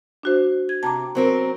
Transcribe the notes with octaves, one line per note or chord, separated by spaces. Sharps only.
D4 F#4 C5
G#6
C3 A5 A#5 D6
F#3 C4 A#4